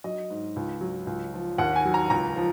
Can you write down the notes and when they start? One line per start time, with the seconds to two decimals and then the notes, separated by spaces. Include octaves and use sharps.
0.04 F#3 D#5
0.30 G#2
0.56 C#2
0.81 F#3
1.07 C#2
1.34 F3
1.58 D#2 F#5
1.76 G#5
1.85 F#3
1.94 A#5
2.10 C#2 A#5
2.36 F3